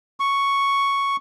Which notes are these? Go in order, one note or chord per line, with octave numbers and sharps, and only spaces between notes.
C#6